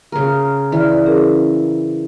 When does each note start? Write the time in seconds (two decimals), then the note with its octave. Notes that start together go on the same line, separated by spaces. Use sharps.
0.12 C#3 A#4
0.72 E3 D5 F6
1.06 C#4 G#4 A#4